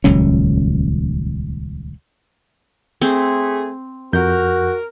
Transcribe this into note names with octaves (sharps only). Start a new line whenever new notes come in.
D#1 C#2 F#3 C#4
A3 C4 G#4
F2 F#4 A#4 G6